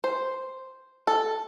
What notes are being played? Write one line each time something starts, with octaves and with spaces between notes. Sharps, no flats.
C5
A4